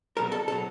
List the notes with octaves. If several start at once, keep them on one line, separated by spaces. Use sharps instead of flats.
C2 B2 F#3 A#4
A4
B2 F#3 A4